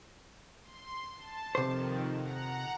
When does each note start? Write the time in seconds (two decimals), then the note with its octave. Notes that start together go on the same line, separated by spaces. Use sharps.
0.63 C6
1.15 A5
1.55 F2 C3 D#3 C5
2.20 F#5 A#5